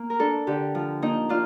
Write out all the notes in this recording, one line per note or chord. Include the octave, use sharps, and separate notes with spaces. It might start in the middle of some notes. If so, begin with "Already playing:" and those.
Already playing: A#3
A#4
D4 A4
D3 G4
F3
A#3 D#4
D4 F4